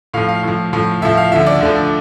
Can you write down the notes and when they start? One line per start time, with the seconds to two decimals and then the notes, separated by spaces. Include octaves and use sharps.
0.14 A2 F3 F5
0.29 F5
0.43 A2 F3
0.73 A2 F3
1.02 A2 F3 E5
1.17 F5
1.32 D2 D3 F3 E5
1.46 D5
1.60 D2 D3 F3